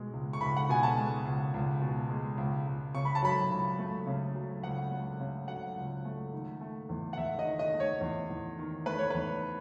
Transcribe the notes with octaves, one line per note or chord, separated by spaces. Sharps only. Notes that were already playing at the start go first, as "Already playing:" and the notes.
Already playing: B2 G#3
C#2
C#6
C#2 B5
F#5
B2 G#5
A5
G#3
C#2
C#2
B2
G#3
C#2
C#2
C#3 C#6
B5
A5
F#3 B5
C#2
A3
C#3
F#3
C#2 F#5
A3
C#3
F#3 F#5
C#2
A3
D#3
A3
E2
F#5
E2 E5
D#5
D#3
D#5
A3
C#5
E2
E2
D#3
A3 B4
C#5
E2 B4